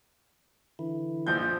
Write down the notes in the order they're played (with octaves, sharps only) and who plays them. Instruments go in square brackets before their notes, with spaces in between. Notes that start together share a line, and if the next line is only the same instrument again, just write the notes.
[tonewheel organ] D3 E3 E4
[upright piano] A#1 F3 G6